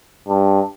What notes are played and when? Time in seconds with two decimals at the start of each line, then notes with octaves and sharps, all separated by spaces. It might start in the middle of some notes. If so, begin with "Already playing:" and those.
0.29 G2